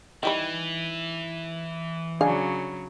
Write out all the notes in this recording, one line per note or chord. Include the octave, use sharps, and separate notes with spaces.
D#3 E3 G3 B5
C#3 F#3 D4 G#4 F5